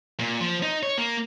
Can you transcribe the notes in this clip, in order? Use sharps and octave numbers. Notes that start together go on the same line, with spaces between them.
A#2
F3
D#4
C#5
A#3